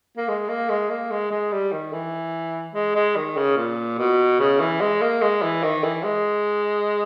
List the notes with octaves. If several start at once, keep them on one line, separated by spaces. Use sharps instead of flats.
A#3
G#3
A#3
G#3
A#3
G#3
G#3
G3
D#3
E3
G#3
G#3
D#3
C#3
A#2
B2
C#3
E3
G#3
A#3
G#3
E3
D#3
E3
G#3